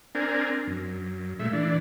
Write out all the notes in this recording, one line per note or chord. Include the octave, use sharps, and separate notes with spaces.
C4 D4 A#4 G#5
F#2
A#2 G#3 A3 E5
E3 D4